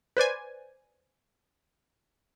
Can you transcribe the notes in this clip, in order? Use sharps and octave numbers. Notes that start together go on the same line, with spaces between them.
B4 C5 D5 G#5